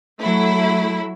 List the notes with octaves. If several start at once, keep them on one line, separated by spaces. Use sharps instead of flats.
F#3 A3 E4